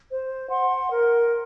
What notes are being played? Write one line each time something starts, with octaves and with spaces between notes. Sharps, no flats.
C5
F#5 C6
A#4